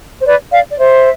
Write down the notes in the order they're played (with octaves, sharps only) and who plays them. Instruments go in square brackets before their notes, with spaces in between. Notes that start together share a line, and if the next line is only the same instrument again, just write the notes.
[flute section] C5
B4 D5
D5 F5
D5
C5 E5